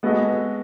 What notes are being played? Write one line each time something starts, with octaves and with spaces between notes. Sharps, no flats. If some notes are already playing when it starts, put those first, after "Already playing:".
G#3 B3 F#4 A4 D#5